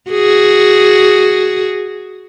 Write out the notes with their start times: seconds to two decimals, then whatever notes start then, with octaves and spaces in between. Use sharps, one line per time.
0.10 F#4 G#4